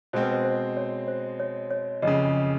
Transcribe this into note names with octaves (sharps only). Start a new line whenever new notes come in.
B2 G#3 C4 C5
B4
C5
C5
C#5
C5
C#5
C#5
F#1 F2 C#3 D#5